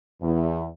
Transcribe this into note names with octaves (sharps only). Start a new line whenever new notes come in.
E2